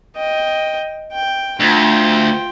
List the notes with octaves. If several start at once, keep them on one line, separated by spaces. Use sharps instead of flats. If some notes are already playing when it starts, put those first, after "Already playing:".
D#5 G5
G5
D2 F4 G5